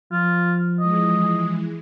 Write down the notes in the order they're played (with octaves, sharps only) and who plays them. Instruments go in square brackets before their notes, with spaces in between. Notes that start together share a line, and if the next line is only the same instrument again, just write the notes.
[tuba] F3 [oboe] F4
[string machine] E3 G#3 [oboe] D#5